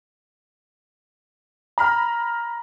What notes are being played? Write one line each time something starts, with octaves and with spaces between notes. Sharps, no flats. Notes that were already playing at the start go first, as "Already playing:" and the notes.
A#5 B5 F6